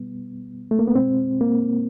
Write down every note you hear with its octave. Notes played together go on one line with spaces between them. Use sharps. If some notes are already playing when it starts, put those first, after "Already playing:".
Already playing: B2 G3 B3
A3
A#3
B3
B2 G#3 C4
A#3